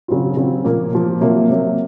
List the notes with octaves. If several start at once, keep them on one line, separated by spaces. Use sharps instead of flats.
C#3 F#3 C4 F4
C#3 F#3 C4 F4
A#2 F3 A#3
A#2 F3 A#3
C3 F#3 A#3
C3 F#3 A#3